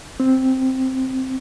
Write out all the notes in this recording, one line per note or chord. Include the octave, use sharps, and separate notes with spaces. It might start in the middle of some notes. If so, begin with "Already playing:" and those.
C4